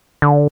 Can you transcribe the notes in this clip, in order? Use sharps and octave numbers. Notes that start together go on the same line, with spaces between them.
D3